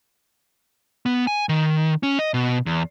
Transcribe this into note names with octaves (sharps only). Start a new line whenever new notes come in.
B3
G#5
D#3
C#4
D#5
B2
E2